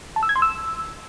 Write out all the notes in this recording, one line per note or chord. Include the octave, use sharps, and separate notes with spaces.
A5
E6
G#6
C6
E6